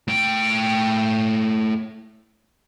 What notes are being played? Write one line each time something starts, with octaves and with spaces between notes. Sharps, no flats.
A2 G5